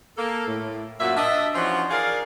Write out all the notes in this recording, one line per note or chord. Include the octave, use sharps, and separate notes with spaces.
A#3 A4
A2
F#2 A#2 F4 F#4 E5
D4 D#5 E5
E3 F3 C#4 D4 F4 F#4
D#4 G#4 A#4 D5 F5